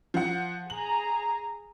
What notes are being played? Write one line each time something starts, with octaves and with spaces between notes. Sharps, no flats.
F3 F#5
G#4 A#5 F#7